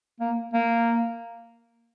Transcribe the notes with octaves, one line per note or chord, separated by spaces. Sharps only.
A#3
A#3